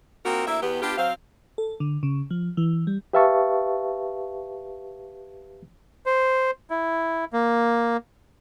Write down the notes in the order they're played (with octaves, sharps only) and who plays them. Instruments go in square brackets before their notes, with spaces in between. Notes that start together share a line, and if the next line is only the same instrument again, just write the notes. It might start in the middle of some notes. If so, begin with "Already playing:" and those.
[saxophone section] A#3 C4 D#4 F4 F#4 A#4
D2 A#3 E4 E5
E2 B3 G4
B3 D4 F4 G4
F#3 C4 F5
[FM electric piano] A4
D3
C#3
F3
E3
G3
[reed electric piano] G4 B4 E5 F5 A5 C#6
[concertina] C5
E4
A#3